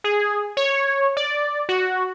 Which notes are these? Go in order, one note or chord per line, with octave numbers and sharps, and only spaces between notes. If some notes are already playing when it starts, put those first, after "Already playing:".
G#4
C#5
D5
F#4